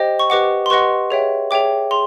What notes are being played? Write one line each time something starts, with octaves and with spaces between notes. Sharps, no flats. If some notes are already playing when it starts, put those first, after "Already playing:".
Already playing: G4 C5 D#5 G5
C#6
G4 B4 D#5 F#5 D6
C6
G4 B4 D#5 F#5 C#6
G#4 C#5 E5 G5
G#4 C#5 E5 G5 D6
G#4 C6